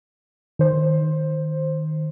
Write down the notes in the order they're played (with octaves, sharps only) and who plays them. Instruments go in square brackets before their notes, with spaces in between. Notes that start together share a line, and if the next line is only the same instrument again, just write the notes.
[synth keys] D#3 C5